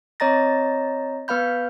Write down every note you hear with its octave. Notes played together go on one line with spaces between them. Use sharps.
C4 C#5 D#5 A#5 A6 A#6
B3 B4 F5 B5 G6